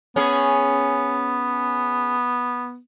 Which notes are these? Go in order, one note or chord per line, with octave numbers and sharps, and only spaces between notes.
B3 C#4 G#4